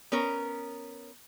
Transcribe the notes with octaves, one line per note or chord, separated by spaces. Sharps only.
B3 C#4 A#4